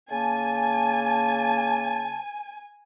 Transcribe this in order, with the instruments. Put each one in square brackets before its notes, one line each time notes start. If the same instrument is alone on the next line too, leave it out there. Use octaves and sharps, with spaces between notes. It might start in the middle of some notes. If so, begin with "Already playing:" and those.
[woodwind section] C#3 A#3 A5 [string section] G#5